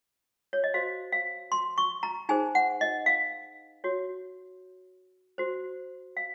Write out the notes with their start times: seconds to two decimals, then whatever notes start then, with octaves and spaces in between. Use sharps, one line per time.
0.53 C#5
0.64 D#5
0.74 F#4 C5 F5
1.12 F5
1.52 C6
1.78 C#6
2.03 A#5
2.29 D#4 G#4 C5 G#5
2.55 F#5
2.81 D#5
3.06 F5
3.84 F#4 C#5
5.38 F#4 C5
6.17 F5